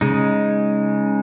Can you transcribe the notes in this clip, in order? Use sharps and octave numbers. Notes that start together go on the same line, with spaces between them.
C#3 G#3 D#4